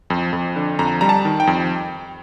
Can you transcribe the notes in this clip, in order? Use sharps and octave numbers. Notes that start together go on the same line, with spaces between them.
F2
F2
D3
F2 A#5
G3 A#5
A5
D#3
G5
F2